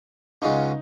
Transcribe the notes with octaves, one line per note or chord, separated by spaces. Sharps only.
C#2 C#3 F#3 C#4 D#4 F4